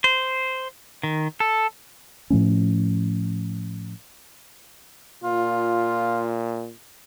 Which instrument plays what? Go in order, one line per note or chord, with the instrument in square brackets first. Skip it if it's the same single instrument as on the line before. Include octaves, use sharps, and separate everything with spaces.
[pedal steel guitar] C5
D#3
A4
[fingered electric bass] A2 F3 A3 C#4
[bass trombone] A#2 [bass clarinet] F4